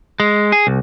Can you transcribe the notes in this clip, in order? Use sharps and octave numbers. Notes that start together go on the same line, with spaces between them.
G#3
G#4
C2